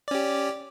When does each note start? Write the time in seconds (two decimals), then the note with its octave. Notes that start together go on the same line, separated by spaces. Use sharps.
0.08 D5
0.11 C#4
0.14 G4